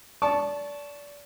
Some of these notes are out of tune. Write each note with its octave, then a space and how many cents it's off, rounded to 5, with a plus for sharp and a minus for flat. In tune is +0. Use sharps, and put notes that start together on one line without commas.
D5 -25 A5 -10 C#6 +0